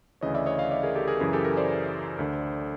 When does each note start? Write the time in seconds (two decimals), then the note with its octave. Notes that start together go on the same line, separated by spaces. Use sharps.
0.21 D2 C#3 E3 C#5 D#5
0.34 D5 E5
0.46 C#5 D#5
0.58 D#5 F5
0.71 D5 E5
0.83 G#4 A#4
0.95 G4 A4
1.08 G#4 A#4
1.20 F#2 C#3 E3 G#4 A#4
1.33 G4 A4
1.45 G#4 A#4
1.57 C5 D5
2.19 D2 D3